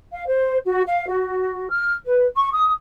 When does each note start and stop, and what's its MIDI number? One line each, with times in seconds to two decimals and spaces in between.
0.12 0.27 77
0.27 0.57 72
0.65 0.82 66
0.85 1.08 77
1.08 1.68 66
1.70 1.94 89
2.06 2.25 71
2.36 2.51 85
2.52 2.70 87